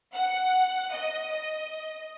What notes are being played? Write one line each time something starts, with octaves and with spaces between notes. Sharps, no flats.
F#5
D#5
D#5